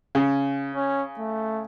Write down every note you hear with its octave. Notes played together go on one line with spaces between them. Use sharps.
C#3
C#4
A3